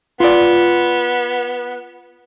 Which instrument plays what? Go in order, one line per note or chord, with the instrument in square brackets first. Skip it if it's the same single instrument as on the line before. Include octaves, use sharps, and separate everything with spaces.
[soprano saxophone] B3 [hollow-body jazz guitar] F4 D5